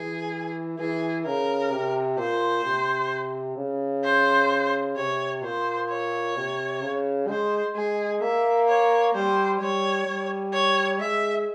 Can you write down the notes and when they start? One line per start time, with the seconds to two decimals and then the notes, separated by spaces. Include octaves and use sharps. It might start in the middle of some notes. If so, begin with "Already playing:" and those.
Already playing: E3 G#4
0.79 E3 G#4
1.26 C#3 A#4
1.72 C3
2.18 A#2 C5
2.65 C3
3.57 C#3
4.04 C5
4.97 C3 C#5
5.44 A#2 C5
5.89 C#5
6.37 C3
6.82 C#3
7.28 G#3 C5
7.75 G#3 G#4
8.21 A#3 E5
8.68 C#5
9.14 G3 C5
9.61 G3 C#5
10.07 G3
10.53 C#5
11.00 G#3 E5